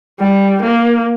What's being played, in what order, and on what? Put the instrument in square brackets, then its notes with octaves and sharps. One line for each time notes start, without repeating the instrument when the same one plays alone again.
[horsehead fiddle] G3
A#3